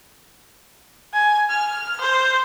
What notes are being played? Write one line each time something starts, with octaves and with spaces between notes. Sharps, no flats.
G#5
F6
C5